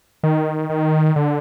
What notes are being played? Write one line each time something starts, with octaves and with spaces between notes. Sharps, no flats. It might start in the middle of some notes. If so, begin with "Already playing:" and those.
D#3
D#3
D3